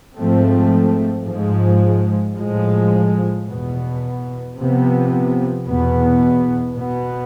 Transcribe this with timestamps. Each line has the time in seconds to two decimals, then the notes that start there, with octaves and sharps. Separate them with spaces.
0.15 G#2 F3 A3 C4
1.25 G#2 F3 G#3
2.35 A2 F3 G#3
3.45 E2 B2 B3
4.56 C3 F3 B3
5.66 E2 B2 B3
6.76 B2 B3